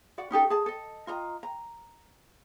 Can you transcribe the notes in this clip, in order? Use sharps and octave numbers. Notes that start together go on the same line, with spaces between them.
F#4 D5 F#5
C#4 D#4 G4 A4
G#4 A5
A4 D#5
F4 D#5 A#5
A#5